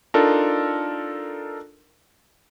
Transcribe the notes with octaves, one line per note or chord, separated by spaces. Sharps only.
D4 D#4 F4 A4 A#4